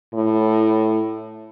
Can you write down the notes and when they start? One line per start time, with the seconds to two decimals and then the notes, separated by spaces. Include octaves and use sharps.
0.14 A2